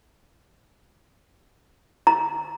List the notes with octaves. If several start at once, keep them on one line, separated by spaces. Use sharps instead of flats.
A#5